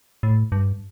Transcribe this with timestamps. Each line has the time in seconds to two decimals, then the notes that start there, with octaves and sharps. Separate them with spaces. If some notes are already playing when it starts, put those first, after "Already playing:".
0.23 A2
0.52 G2